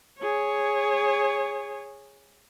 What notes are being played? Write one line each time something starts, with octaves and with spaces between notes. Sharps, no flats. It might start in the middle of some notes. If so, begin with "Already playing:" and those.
G#4 C#5